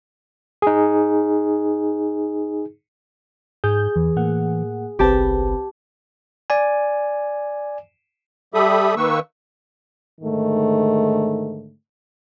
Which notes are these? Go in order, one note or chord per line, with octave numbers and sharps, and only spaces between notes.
D#4 G#4
G#2 G#4 G6
E2 E3
A2 A#3 F#5
G1 C2 C4 G4 B4 A5
D5 G#5
G3 G4 A4 E5 B5 D#6
D#3 A#3 B4 C#6 E6
G#2 D3 D#3 A3